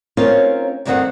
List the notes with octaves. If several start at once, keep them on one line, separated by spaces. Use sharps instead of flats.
C4 C#4 D#4 F4 A#4 C#5
D2 G2 D3 D#3 C4 F#5